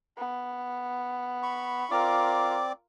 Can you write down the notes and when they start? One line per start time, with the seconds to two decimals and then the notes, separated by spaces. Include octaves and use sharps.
0.18 B3
1.43 B5 C#6
1.91 C4 F4 A#4 D5 D6